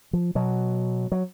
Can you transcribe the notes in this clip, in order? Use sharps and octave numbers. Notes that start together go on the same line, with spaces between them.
F3
B2 F#3
F#3